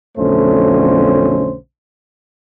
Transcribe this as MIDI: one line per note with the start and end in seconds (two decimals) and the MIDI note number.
0.17 1.56 35
0.17 1.56 41
0.17 1.56 50
0.17 1.56 57
0.17 1.56 61
0.17 1.56 72